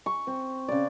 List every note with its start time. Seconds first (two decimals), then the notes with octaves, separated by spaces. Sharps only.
0.06 C#6
0.27 C4
0.68 C#3 D5